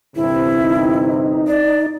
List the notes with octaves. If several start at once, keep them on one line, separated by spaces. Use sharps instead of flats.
G1 E2 C3 E4
D#4
D5